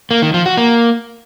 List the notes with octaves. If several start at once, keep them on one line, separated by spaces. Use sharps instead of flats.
A#3
D#3
F3
F#4
A#3